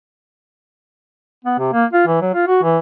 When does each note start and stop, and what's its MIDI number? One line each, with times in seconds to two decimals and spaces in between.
1.44 1.57 59
1.59 1.72 48
1.73 1.85 58
1.93 2.04 65
2.07 2.20 52
2.21 2.31 54
2.34 2.46 65
2.48 2.59 66
2.63 2.78 52